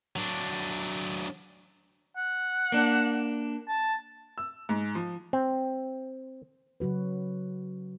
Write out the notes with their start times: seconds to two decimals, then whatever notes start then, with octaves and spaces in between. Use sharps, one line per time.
0.16 F#3 D4
2.17 F#5
2.72 A#3 D4
3.69 A5
4.38 E6
4.69 G#2
4.95 F3
5.33 C4
6.80 C#3 F#3 F#4 B4